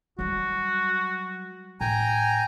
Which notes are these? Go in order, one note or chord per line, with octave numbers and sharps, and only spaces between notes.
F#3 G3 F#4
A2 G5 G#5 A#5